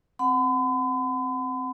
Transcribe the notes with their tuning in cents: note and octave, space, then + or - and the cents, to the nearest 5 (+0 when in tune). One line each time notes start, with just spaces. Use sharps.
C4 -5 F#5 +0 B5 +45